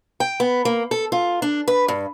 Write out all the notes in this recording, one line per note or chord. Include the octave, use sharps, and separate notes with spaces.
G5
B3
A#3
A4
F4
D4
B4
G2